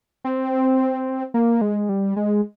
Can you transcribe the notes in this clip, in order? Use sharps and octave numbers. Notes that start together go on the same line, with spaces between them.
C4
A#3
G#3
G3
G#3